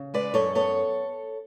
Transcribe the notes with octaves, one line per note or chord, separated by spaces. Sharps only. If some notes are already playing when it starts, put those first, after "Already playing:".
Already playing: C#3
G#3 B4 D5
F#2 A4 C#5
B3 A4 C#5